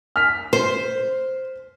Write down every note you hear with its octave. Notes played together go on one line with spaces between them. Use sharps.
F6 B6
C5